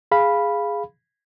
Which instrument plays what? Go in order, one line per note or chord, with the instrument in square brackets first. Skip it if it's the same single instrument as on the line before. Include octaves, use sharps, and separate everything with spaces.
[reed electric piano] G#4 F5 B5